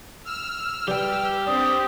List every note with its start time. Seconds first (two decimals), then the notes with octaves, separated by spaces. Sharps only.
0.25 E6 F6
0.88 G3 G4 B4 G5
1.47 C4 D4 D#6